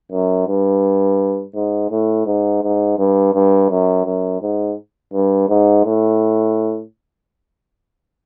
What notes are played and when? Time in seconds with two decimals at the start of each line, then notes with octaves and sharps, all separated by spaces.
0.12 F#2
0.47 G2
1.54 G#2
1.91 A2
2.26 G#2
2.63 G#2
2.99 G2
3.34 G2
3.70 F#2
4.06 F#2
4.42 G#2
5.13 G2
5.49 G#2
5.85 A2